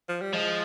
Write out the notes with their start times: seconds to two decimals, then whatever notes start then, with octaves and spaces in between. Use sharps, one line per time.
0.09 F3
0.21 G3
0.34 F3 G#3